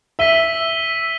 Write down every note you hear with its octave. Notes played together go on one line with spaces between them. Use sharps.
E5 E6 B6 D#7 G7